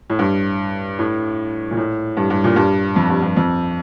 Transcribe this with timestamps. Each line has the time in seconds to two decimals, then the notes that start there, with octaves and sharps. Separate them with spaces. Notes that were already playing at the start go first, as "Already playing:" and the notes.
0.10 A2
0.19 G2
0.99 A2
1.71 A#2
1.77 A2
2.17 G2
2.30 G2
2.44 A#2
2.56 G2
2.96 F2
3.10 G2
3.22 G2
3.36 F2